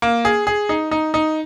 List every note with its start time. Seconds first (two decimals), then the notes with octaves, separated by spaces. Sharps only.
0.02 A#3
0.25 G#4
0.47 G#4
0.69 D#4
0.91 D#4
1.14 D#4